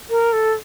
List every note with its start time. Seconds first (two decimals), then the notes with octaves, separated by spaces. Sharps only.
0.10 A#4
0.33 A4